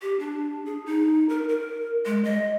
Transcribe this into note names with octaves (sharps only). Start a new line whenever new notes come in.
G4
D4
G#4
D#4
A#4
A#4
G#3
D#5